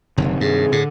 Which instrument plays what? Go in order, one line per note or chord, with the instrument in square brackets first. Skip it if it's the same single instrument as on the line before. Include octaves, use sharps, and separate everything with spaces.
[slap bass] F#1 [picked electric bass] C3 D#3
[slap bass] G2 [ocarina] G#4
[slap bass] A2 [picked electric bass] D3